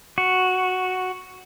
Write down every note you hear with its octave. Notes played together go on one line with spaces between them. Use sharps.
F#4